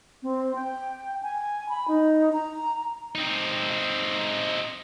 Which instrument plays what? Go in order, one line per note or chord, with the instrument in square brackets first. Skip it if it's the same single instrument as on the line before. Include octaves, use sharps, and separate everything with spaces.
[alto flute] C4
G5
G#5
B5
D#4
A#5
[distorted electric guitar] C4 D#4